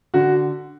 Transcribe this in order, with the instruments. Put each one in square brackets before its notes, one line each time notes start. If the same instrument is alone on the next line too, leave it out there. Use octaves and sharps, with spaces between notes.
[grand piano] D3 F#4